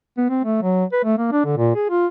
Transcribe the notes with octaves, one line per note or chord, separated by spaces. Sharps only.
B3
C4
A3
F#3
B4
A3
A#3
D4
D3
A#2
G#4
F4